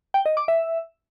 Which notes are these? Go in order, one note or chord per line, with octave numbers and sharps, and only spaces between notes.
G5
D#5
D6
E5